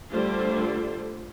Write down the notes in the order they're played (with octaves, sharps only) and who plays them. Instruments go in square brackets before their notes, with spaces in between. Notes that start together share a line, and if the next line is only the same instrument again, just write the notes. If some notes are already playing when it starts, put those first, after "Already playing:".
[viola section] D3 G3 A3 F4 C5